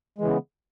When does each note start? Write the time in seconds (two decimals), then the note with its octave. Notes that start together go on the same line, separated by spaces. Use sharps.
0.18 G#3
0.21 E3
0.24 C#3
0.27 B3